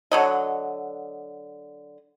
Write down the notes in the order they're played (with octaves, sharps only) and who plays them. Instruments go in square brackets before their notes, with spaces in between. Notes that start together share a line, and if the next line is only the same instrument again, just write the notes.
[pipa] D3 F#3 D#5